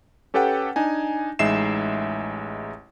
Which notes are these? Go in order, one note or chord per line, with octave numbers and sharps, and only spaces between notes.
C#4 G4 A4 B4 F#5 G5
D4 D#4 G#5
A1 G#3 D#4 E5 C7 E7